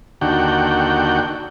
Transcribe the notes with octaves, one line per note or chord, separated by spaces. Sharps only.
D#2 D3 F#4 G5